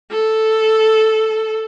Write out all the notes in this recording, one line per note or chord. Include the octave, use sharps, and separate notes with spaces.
A4